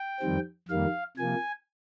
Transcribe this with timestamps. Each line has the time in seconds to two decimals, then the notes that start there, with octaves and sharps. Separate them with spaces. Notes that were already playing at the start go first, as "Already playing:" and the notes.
Already playing: G5
0.20 F2 D#3 G3 C4
0.68 F2 D#3 G3 A#3 F5
1.17 C3 F3 A#3 G#5